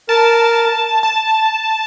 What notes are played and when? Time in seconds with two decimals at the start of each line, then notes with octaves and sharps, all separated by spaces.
0.09 A#4 A5
1.03 A5